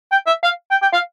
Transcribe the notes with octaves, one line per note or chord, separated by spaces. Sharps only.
G5
E5
F5
G5
G5
F5